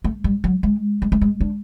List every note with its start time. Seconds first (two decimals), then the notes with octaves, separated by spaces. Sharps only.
0.04 A3
0.24 G3
0.44 F#3
0.63 G#3
1.02 G#3
1.12 A3
1.21 G#3
1.41 D4